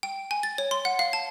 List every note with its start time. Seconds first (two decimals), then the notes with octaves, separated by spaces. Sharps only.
0.03 G5
0.31 G#5
0.43 A6
0.58 C#5
0.71 C6
0.85 F#5
0.99 F5
1.13 A5